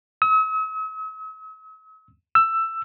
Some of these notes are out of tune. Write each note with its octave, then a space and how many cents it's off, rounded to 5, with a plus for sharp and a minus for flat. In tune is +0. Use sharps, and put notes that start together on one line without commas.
E6 -45
E6 +15